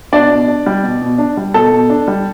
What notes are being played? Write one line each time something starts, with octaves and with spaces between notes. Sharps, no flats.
B2 D4 D5
B2
D4
G3
B2
B2
D4
G3
B2 A4
B2
D4
G3